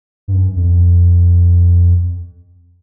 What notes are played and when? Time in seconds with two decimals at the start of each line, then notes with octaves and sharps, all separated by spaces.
0.28 G2
0.34 F#2
0.56 F2